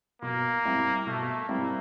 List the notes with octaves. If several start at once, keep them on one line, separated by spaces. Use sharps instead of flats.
B2 A#3
G3 C4 E4
B2 A3
G3 A#3 C4 E4